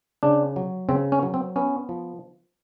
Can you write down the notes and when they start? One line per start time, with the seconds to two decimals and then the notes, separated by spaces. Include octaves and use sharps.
0.23 C#3 D4
0.56 F#3
0.89 C#3 C4
1.12 C#4
1.23 F#3
1.34 C4
1.56 B3 C#4
1.89 F3